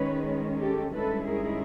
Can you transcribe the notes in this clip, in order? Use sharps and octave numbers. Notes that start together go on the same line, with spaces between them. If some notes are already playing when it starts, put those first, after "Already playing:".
Already playing: D#3 G#3 C#4 B4 C#5
G4 A4
G2 D#3 G#3 C#4 E4 A4 B4
G#4 A#4